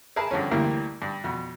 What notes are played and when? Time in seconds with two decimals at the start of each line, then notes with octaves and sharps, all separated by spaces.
0.16 G#4 A#4 B4 E5 A5
0.31 G2 D3 F3 C#4
0.51 D2 G2 C3 E3 A#3 A#4
1.02 G2
1.24 F2 B2